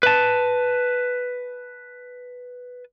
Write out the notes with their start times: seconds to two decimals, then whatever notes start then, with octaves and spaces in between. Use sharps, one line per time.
0.03 B4 A5